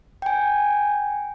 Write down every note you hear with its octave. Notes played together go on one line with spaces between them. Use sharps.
G5 G#5